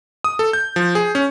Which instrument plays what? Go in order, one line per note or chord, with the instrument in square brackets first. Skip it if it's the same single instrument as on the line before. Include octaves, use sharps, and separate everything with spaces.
[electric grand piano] D#6
A4
G6
F3
G#4
C#4